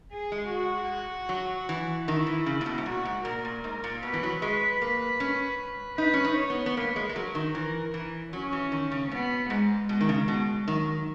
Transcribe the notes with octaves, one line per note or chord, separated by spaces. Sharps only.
G#4
G#3
F#4
F#3
E3
D#3 E4
E3
C#3
A#2
B2
G#2
A#2 F#4
G#2
A#2 A#4
A#2
G#2 A#4
A#2
B2 B4
E3
F#3
G#3 B4
A#3
C#4
D#4 B4
C#4
D#4
C#5
B3
B3
A#3 B4
G#3
G#3
F#3 A#4
D#3
E3 A#4
E3
F#3 C#4
E3
D#3
C#3
B2 B3
G#2 G#3
B2 G#3
D#3
C#3
B2
D#3 F#3